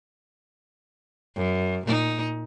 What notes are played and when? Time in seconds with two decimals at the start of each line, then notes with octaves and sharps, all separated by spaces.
1.36 F#2
1.86 A#2 D#4